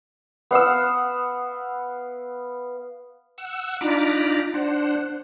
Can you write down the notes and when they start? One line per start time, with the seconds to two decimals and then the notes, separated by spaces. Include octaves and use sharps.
0.51 B3 F5 F#5 E6
3.38 F#5 E6
3.81 D4 D#4 F4 A#5 B5 D6
4.54 D4 C5 F#5